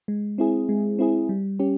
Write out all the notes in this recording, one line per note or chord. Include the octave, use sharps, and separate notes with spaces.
G#3
C4 E4 G#4
G#3
C4 E4 G#4
G3
C#4 G4